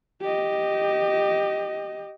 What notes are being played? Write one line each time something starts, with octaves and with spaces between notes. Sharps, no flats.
G4 D#5